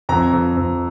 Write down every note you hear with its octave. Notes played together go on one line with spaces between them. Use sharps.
F2 A#5
F2
F2